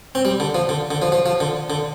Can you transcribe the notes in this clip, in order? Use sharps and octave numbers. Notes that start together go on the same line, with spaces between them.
C4
G3
D3
F3
D3
D3
F3
F3
F3
D3
D3